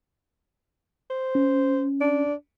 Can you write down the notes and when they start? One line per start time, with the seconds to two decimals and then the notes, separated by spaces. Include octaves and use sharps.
1.10 C5
1.35 C#4
2.01 D4